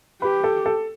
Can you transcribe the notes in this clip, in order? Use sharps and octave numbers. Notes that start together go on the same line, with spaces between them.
G4 B4
A4
A4